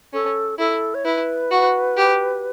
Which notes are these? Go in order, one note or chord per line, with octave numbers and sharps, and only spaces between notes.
C#4 A4
E4 A4
C#5
E4 B4
F#4
G4